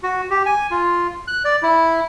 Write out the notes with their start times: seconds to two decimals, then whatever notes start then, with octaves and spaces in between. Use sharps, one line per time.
0.03 F#4
0.30 G4
0.46 G#5
0.71 F4
1.28 F#6
1.45 D5
1.63 E4